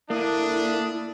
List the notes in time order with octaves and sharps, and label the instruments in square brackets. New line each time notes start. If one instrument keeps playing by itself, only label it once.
[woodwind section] D3 E5 D#6 [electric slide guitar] A#3 [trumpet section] D4 [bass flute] E4